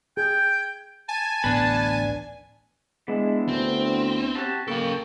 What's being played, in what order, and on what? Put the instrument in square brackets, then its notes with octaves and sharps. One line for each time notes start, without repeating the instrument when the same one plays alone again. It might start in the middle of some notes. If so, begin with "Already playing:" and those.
[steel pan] G#4 [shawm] G5 [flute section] G6 G#6
[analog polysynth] G#5 [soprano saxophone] A5
[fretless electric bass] D1 A1 B3 [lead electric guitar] D4 B4
[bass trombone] G#3 [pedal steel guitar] B3 D4 E4
[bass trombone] D2 [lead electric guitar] C4
[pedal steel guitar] F#4 G4 A5
[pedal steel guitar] C#3 G5 C#6 [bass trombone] A#3 [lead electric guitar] A4 F5